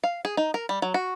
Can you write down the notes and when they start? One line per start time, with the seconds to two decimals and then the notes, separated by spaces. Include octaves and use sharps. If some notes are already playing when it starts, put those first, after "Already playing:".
0.04 F5
0.25 G#4
0.37 D#4
0.54 A#4
0.69 G3
0.82 F#3
0.94 F#4